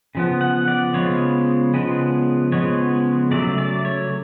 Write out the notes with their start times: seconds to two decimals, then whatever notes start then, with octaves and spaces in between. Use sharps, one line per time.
0.15 C#3 F3 B3
0.41 F#5
0.68 D5
0.94 C#3 F3 G#3 B3 C#5
1.74 C#3 F3 G#3 B3
2.52 C#3 F3 G#3 B3 C#5
3.31 C#3 F#3 A3 D5
3.58 D5
3.85 C#5